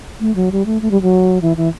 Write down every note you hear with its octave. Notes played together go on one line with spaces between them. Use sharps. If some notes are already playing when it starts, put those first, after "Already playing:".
A3
F#3
G3
A3
A3
G3
F#3
E3
E3